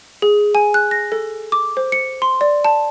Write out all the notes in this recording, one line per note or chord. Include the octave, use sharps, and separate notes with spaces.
G#4
G#5
F#6
A#6
A4
D6
C5
C#7
C6
D5
A5